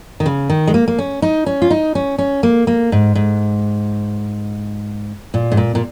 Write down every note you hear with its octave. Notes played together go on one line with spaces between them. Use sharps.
D#3
C#3
D#3
G#3
A#3
A#3
C#4
D#4
C#4
F4
D#4
C#4
C#4
A#3
A#3
G#2
G#2
A#2
G#2
A#2
A#2